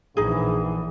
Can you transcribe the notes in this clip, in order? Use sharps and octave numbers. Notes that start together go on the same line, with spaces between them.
A#1 E3 D#4 G#4